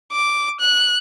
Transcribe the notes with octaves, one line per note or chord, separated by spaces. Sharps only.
D6
F#6